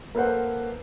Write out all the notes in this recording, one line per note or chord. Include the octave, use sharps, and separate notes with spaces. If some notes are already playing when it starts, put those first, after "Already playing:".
A#3 A4 B4 C5 F#5